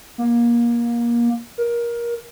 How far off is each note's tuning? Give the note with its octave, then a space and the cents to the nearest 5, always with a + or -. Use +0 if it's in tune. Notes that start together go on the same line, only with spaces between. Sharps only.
A#3 +25
A#4 +20